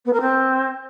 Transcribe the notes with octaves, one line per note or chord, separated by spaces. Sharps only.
B3
A#4
C4